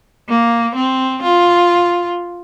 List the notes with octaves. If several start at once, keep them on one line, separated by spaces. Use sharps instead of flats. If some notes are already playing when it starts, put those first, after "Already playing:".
A#3
C4
F4